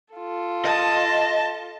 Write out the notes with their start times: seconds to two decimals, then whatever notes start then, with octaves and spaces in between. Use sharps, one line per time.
0.14 F4 A4
0.65 D#5 A5